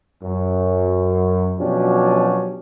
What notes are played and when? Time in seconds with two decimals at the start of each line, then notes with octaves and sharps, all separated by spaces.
0.23 F#2
1.59 B2 F3 F#3 C#4 D4 G4